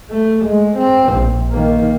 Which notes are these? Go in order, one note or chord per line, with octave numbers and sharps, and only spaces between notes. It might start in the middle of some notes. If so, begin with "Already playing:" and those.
A3
G#3
C4
A#1
D#3 A#3